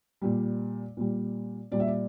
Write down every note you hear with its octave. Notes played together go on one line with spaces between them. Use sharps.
A#2 G3
A#2 G3
A#2 G3 D5
E5
D5